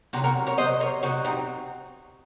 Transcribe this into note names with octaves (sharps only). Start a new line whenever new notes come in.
C3 F#3 D#4 F#4
F#4 A#4
A#4 C#5
C3 F#3 C5 D#5
A#4 C#5
C3 D#3 F#3 D#4 F#4
C4 D#4